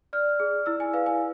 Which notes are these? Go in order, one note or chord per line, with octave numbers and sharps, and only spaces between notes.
D5 F6
G#4
E4 E6
G#5
B4 F5
G#5